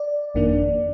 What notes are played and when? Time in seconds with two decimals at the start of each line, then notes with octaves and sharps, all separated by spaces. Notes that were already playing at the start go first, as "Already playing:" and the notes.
Already playing: D5
0.34 G1 F2 D#3 A#3 D4